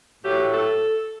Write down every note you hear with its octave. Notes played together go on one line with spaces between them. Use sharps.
A2 F#3 A3 G4
A4